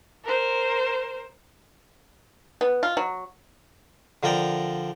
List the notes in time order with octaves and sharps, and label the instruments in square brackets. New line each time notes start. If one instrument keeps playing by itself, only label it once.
[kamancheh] A#4 C5
[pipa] B3
F4
F#3
[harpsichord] D3 F3 A#4 D5 G5 A#5